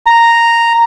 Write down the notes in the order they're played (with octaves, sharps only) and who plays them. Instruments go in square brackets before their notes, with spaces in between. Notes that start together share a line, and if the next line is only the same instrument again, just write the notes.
[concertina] A#5